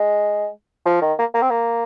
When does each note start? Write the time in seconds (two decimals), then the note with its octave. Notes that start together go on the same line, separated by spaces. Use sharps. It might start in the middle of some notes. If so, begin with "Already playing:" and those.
Already playing: G#3
0.85 F3
1.01 D#3
1.19 A#3
1.34 A#3
1.42 C4
1.50 A#3